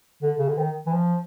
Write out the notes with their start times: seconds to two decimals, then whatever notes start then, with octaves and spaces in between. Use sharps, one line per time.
0.22 D3
0.38 C#3
0.48 D3
0.59 D#3
0.86 E3
0.93 F3